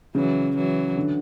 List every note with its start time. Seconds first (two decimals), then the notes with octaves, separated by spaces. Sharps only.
0.15 C#3 E3 F#3
0.56 E3 F#3
0.96 D3